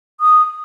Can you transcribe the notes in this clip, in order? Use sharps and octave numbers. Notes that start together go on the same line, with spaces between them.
D#6